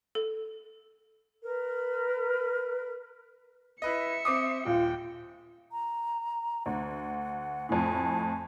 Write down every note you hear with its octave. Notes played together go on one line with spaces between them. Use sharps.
A4
A#4 B4
E4 B4 D#5 E5 C#7
C4 D6 D#6
D#1 F4 G5
A#5
D2 F#5
F2 A2 G#5